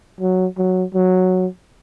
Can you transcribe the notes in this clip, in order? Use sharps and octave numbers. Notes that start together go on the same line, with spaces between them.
F#3
F#3
F#3